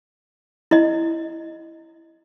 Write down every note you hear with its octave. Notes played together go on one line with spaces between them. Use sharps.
E4 D#5